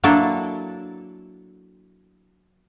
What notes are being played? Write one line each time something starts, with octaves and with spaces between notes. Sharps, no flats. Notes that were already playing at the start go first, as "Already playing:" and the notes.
F#3 A#3 D4 E4 A4